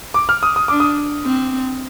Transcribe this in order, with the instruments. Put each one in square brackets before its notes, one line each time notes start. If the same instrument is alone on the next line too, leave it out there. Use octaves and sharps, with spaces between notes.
[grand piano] D6
F6
D#6
D#6
[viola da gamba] D4 [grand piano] D6
[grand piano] D#6
[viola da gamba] C4